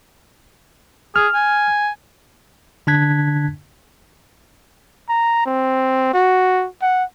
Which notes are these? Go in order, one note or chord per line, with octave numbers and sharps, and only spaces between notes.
G#4 F6
G#5
D3 D4 A5 F#6 G#6 B6
A#5
C4
F#4
F#5